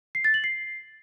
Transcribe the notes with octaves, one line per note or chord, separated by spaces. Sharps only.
C7
A6
F#7
C7